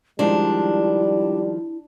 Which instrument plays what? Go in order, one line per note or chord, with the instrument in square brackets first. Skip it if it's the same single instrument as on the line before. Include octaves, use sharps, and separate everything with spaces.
[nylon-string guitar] D#3 F3 G#3 [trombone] G3 [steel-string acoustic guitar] D4 [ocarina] E4